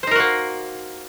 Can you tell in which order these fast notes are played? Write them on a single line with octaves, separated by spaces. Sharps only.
C5 D#4 A#4 F#4 A#3